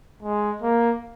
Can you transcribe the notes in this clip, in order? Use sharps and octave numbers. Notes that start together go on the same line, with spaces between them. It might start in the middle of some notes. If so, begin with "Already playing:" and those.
G#3
A#3